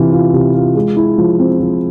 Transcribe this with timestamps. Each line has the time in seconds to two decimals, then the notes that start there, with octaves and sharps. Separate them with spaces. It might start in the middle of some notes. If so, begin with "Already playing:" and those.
Already playing: C3 E3 F4
0.12 F4
0.33 C3
0.54 F4
0.75 G#3
0.97 E4
1.18 F3
1.39 C4
1.60 F3